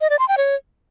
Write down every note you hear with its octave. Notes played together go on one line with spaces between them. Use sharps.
D#5
D5
C6
G5
C#5